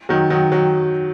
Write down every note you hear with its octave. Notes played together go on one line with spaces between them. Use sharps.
D#3 F#3
D#3 F#3
D#3 F#3